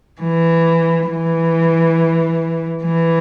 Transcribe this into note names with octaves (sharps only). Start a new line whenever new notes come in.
E3
E3
E3